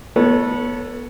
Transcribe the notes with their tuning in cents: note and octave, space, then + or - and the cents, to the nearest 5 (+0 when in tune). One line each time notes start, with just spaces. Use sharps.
B3 -25 A4 +15 C#5 +0